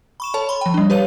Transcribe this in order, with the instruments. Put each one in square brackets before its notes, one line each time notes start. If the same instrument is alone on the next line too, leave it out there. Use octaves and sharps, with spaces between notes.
[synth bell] B5 C#6 E7
A4 C#5 A5
B5 C6
F3 G5
G3 D4
G4 B4 C#5 F5 D#7